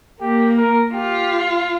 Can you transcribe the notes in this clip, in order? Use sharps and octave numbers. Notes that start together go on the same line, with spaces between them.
A#3 G4
A#4
F4 G4